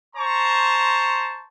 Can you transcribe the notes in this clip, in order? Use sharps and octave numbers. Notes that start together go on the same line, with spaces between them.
C5 A5 A#5 C6 C#6